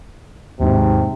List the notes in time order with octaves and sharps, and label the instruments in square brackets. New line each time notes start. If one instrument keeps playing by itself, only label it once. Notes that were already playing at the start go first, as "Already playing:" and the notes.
[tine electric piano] D#2 G#2 [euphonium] C3